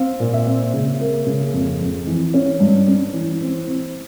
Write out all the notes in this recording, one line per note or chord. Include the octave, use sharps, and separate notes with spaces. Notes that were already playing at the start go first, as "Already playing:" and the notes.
Already playing: C4 F5
A#2
E5
C4
C#3
A#3
C#3
F2
F2
E3
C#4 C#5
G2
C#4
E3
C4
C4